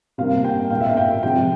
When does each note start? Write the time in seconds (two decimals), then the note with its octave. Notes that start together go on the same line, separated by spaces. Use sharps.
0.18 C3 G3 A#3 F5
0.44 G5
0.70 A#2 G#3 F5
0.80 E5
0.89 F5
0.97 G5
1.23 C3 F3 G#3 G5